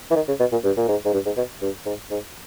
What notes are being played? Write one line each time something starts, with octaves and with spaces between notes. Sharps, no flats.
E3
D#3
C#3
B2
A#2
G2
A#2
G#2
G#2
G2
G#2
B2
G2
G#2
G#2